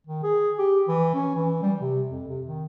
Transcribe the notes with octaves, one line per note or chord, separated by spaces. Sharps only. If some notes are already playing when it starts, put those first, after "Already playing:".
D#3
G#4
G4
E3
C#4
E3
G3
C3
F2
C3
D#3